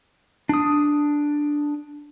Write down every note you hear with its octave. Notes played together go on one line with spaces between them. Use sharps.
D4 D#6